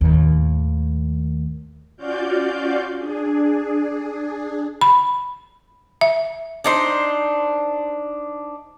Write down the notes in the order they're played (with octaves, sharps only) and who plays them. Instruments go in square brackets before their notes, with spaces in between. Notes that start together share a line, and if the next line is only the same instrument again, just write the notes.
[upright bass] D#2 A2
[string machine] C#4 F4 F#4 D5 F5 G6
D4 G#4
[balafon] B5
E5
[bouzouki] D4 D#4 C5